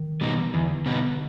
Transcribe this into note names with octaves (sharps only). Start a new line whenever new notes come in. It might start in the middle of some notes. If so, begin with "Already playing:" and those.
Already playing: D#3
B2 G3 B3 D#4
E3
D#3
E2 D3
B2 G3 B3 D#4